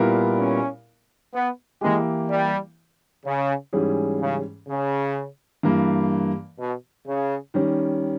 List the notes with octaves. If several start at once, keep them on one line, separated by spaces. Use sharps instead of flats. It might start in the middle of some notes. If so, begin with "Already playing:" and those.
Already playing: A#2 G3 B3 E4 A#4
C#4
B3
E3 G#3 A#3 E4 G4
G3
C#3
G#2 E3 G3 C#4 G#4
C#3
C#3
G2 E3 A#3
B2
C#3
D#3 G3 C#4